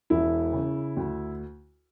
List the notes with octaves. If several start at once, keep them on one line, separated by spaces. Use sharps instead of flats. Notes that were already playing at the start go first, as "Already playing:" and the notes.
E1 E4
C#3
D2